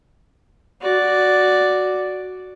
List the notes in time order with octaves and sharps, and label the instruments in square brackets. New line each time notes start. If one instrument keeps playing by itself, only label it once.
[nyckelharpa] F#4 D5